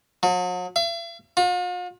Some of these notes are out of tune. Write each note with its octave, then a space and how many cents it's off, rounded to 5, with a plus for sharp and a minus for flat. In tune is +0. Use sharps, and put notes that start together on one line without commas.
F#3 -40
E5 +45
F4 +45